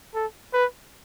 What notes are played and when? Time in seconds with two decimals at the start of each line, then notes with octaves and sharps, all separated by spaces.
0.15 A4
0.54 B4